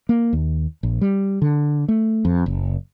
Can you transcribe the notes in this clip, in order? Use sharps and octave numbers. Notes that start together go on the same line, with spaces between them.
A#3
D#2
A#1
G3
D3
A3
F2
F#1